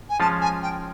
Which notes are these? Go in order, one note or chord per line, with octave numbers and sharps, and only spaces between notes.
G#5
F3 G#3 C#4 F4 A5
G#5
G5